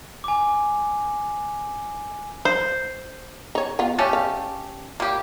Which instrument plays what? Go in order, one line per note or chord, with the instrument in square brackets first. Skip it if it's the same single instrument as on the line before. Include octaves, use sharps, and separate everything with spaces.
[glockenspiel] G#5 D6
[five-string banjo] C5
[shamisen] D#4 C#5
B3 F4
[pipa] A3 C#4 G4
[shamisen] F5
[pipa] A#3 G4